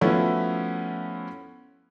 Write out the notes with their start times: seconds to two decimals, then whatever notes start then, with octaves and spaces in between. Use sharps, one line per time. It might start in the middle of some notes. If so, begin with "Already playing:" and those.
0.01 F3 A3 B3 C#4 E4 F#4